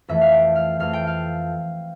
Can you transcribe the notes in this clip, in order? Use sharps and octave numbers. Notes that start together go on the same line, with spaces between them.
F2 E3 A3 E5
F5
G5
F5
F2 E3 A3 F5
G5
F5